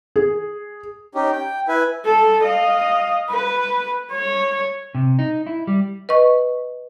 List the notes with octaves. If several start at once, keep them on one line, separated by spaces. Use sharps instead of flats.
G#4
C#4 D#4 G4
G5
E4 B4 G#5
A4
D#5 F5
B4
C#5
C3
D#4
E4
G3
B4 D#5 C#6